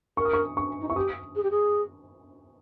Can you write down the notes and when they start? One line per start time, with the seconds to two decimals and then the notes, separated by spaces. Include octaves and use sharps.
0.17 A#4 C#6
0.25 D#6
0.33 C#6
0.57 C#6
0.81 D#4
0.89 E4 C#6
0.96 G4 D#6
1.36 G#4
1.43 G4
1.51 G#4